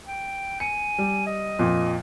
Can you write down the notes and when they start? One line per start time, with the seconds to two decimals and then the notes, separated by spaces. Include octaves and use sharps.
0.06 G5
0.60 G#5 C#7
0.98 G3
1.27 D#5
1.59 F2 A#2